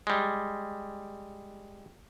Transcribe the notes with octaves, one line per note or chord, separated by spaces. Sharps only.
G3 G#3